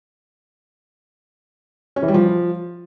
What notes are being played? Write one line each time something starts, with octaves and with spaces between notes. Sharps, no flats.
C#4
E3
G3
F3